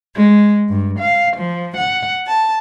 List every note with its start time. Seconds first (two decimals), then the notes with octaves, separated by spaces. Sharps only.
0.16 G#3
0.69 G2
0.99 F5
1.35 F3
1.76 F#5
2.28 A5